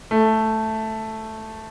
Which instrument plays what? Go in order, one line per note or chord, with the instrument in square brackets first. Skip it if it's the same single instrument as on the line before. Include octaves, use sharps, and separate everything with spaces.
[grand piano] A3